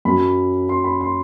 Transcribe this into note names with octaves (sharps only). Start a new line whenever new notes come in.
F#2 F#3 B5
C6
B5
C6